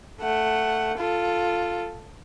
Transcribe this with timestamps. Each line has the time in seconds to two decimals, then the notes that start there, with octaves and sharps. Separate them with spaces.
0.21 A3 F#5
0.98 F4 A4